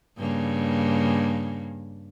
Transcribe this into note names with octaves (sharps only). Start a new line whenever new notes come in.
G2 C#3 A#3